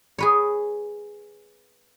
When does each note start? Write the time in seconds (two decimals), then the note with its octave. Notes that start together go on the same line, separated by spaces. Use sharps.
0.18 G#4 B4 C#5